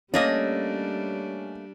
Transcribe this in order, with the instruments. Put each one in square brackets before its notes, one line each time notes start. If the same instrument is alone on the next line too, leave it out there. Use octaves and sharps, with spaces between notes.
[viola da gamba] G3 D4 [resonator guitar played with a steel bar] A3 A#3 D#5 [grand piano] C#4